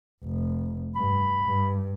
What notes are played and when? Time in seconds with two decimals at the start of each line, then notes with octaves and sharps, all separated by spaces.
0.24 F1
0.95 G2 B5
1.44 G2